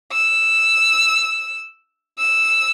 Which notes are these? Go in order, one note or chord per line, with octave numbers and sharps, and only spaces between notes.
E6
E6